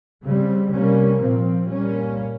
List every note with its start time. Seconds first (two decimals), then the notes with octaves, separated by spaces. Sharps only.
0.24 C#3 G3 C4
0.73 C3 G3 A#3 C#4
1.22 A#2 F3 C4
1.71 A#2 G3 A#3 C#4